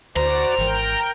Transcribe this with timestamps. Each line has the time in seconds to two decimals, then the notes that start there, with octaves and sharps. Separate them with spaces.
0.16 D2 F#4 C5 D5 A#5
0.58 G#1 E3 A#4 G5